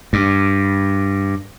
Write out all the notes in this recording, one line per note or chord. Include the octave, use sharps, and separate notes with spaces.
G2